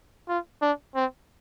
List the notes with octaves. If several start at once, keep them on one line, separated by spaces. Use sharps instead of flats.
F4
D4
C4